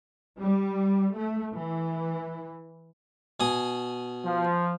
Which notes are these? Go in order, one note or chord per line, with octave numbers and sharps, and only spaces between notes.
G3
A3
E3
B2 G#5 D#6
F3